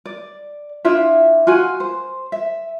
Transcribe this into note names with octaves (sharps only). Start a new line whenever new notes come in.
D5
D4 E4 F4 E5
F4 F#4 G#5
C5
E5